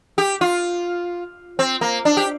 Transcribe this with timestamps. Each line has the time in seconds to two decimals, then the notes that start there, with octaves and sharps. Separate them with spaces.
0.18 G4
0.41 F4
1.59 C4
1.81 A#3
2.05 D4
2.17 G4